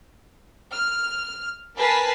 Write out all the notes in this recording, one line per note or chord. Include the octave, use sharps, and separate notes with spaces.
F6
A#4 B4 G#5 A5 B6 C7